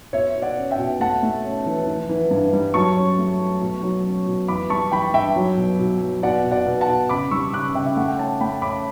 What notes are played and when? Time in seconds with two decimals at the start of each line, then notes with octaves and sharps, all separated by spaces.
0.13 B2 C#5 E5
0.36 B2
0.42 D5 F#5
0.57 C#4
0.71 E5 G5
0.78 B2
1.00 A3 F#5 A5
1.23 A3
1.44 C#4
1.66 E3
1.87 E3
2.09 E3
2.31 G2
2.53 G3
2.74 F#3 A5 C#6
2.97 C#4
3.18 A3
3.40 A3
3.61 B2
3.83 F#3
4.05 C#4
4.27 B2
4.48 E3 B5 D6
4.70 G3 A5 C#6
4.92 E3 G5 B5
5.13 G2 E5 G5
5.36 F#3
5.57 B2
5.79 B2
6.01 F#3
6.22 B2 D5 F#5
6.44 B2
6.51 D5 F#5
6.66 B2
6.81 F#5 A5
6.88 B2
7.09 C#3 B5 D6
7.31 G3 C#6 E6
7.53 C#3 D6 F#6
7.74 C#3 E5 G5
7.86 E5
7.96 A3 F#5
8.08 G5
8.18 C#4 F#5 A5
8.41 A3 G5 B5
8.62 C#4 B5 D6